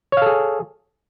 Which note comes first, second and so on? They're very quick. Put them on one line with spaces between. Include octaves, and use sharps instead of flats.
C#5 F5 A4 G#4